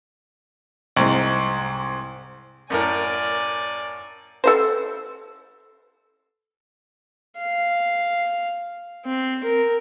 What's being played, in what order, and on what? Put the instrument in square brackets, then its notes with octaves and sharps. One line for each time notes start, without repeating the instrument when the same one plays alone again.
[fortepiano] C2 G#2
[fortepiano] F#2 A2 A#4 [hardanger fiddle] D5 G#5
[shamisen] A4 B4 C5
[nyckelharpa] F5
C4
A#4